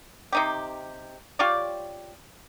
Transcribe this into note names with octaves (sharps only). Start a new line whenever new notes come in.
C3 D#4 G4
F4 G4 C#5 D5